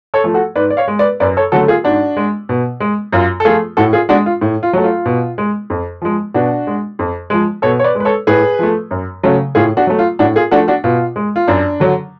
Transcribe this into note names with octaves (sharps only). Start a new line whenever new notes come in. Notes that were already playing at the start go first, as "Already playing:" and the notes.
A4 C#5
F3 A3
F#4 A4
G#2 B4 D5
D5
C#5 F5
G#3
B4 D5
F#2 B4 D5
A4 C#5
D3 F#3 A3 F#4 A4
F4 G#4
G#2 D4 F#4
G#3
B2
G#3
F#2 F4
A4
F3 A3 F4 G#4
A2 F#4 A4
F4 G#4
G#3 D4 F#4
F4
A2
F4
F#3 A3
F4
B2
G#3
F2
F3 G#3
B2 D4 F#4
G#3
F2
F3 G#3
B2 A4 C#5
C#5
B4 D5
G#3
B4
A4 C#5
A2 G#4 B4
F3 A3
F#2
C#3 F#3 A3
A2 F4 G#4
D4 F#4
F#3 A3
F4
A2 D4 F#4
F4 G#4
F3 A3 D4 F#4
D4 F#4
B2 F4
G#3
F4
F#2 D4
D3 F#3